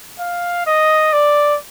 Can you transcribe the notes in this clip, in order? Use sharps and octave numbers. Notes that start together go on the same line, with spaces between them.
F5
D#5
D5